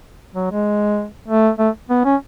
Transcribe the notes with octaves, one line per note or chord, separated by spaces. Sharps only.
F#3
G#3
A3
A3
B3
C#4